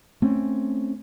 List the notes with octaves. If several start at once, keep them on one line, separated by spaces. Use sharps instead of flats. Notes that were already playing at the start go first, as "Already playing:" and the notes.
A3 C4 C#4